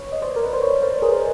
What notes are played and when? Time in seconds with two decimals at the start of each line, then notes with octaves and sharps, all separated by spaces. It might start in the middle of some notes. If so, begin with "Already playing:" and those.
Already playing: B4 C#5
0.12 D#5
0.22 C5 D5
0.36 A#4
0.45 B4
0.53 C5
0.62 B4 C#5
0.82 A#4 C5
1.02 G#4 A#4
1.13 C5